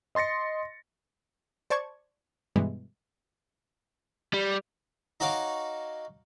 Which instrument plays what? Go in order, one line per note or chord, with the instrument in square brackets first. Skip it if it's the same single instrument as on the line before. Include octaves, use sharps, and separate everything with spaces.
[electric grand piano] D#5 C6 A6 A#6 C#7
[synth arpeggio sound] C5 D5 A5 C#6 G#6
G2 B2 E3 G3 G#3
[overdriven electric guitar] G3
[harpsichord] D#4 F#4 C#5 F5 D6